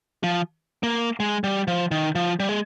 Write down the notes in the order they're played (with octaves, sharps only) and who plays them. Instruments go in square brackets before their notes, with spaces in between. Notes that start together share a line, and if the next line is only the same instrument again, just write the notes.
[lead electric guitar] F3
A#3
G#3
G3
F3
D#3
F3
G3
G#3